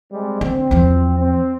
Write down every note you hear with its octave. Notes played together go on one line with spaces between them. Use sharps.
G3 G#3 C4
D3 C4
E2 F3
C4